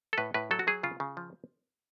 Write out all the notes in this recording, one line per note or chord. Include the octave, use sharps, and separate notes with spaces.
A4
A2 B4
A2 B4
F#3 A4
F#4
F#3 G#4
C#3 F4
C#3
F3